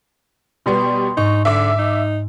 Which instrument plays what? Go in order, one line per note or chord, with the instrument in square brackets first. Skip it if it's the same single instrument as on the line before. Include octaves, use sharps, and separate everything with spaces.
[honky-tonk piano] B2 G3 B3 [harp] C6
[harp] G#2 [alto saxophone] D#4 [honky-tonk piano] C#6
[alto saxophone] D3 [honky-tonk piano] E5 D6
[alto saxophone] D#4